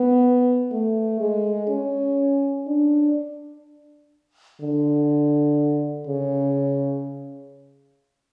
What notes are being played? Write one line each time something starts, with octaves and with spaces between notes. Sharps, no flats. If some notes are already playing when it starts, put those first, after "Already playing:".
Already playing: B3
A3
G#3
C#4
D4
D3
C#3